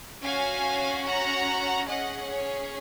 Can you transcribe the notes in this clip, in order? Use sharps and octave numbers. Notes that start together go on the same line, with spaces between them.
C#4 F#4 F5 G#5
F#5 A#5
C#4 G#4 D#5 F#5
C#5